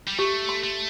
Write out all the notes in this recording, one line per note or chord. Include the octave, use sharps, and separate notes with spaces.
G3
A3 G4
C6
A3